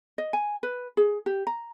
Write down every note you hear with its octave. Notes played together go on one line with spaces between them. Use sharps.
D#5
G#5
B4
G#4
G4
A#5